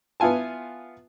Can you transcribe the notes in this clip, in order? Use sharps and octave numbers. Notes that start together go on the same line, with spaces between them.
B3 E4 F4 G#5 A5